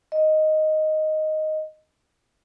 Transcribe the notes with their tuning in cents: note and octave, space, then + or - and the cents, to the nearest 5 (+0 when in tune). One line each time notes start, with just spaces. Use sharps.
D#5 +0